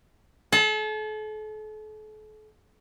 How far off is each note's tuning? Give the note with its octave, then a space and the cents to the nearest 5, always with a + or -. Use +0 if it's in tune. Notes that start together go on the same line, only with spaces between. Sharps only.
A4 -40 A5 +20